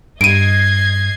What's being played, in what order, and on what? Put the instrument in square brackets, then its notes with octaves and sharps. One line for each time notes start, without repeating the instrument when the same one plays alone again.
[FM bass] G2 [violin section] D#5 G#6 C7 [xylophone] D7 D#7